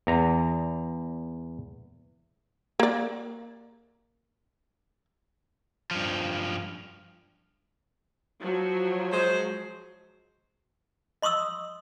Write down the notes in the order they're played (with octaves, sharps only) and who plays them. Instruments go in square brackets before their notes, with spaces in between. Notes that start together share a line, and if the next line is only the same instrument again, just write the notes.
[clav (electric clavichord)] E2 A#5
[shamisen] A#3 D5
[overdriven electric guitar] G2 F3
[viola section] F3 F#3
[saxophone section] G#3 C5
[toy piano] D#5 C6 C#6 D#6 E6